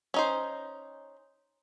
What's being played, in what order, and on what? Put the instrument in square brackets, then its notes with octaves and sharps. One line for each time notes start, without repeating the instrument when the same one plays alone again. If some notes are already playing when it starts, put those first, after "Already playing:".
[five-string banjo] C#4 D#4 C5